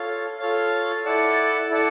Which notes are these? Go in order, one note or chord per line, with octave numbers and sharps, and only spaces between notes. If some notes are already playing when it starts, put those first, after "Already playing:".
Already playing: F4 A4 C#5 F5
F4 A4 C#5 F5
E4 A4 D5 F#5 A5
E4 A4 D5 F#5 A5